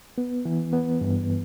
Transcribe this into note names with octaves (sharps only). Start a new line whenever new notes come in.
B3
E3
B3
G2